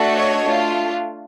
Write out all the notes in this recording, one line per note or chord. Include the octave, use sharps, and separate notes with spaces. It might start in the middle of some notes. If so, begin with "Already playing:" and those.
Already playing: A3 D4 F#4 A4
C#5 D#5
A3 D4 F4